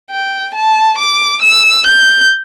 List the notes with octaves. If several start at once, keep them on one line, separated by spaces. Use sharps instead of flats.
G5
A5
D6
E6
G6